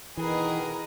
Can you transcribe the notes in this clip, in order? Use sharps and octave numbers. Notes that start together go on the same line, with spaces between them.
B2 D#3 E3 G#4 A#4 B4